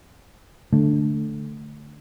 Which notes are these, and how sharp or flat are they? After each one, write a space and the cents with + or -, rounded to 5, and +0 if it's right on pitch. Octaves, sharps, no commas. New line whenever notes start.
D3 +0 A3 +0